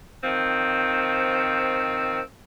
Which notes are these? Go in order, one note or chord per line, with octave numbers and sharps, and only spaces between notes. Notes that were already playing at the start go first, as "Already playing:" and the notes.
D#3 F3 C4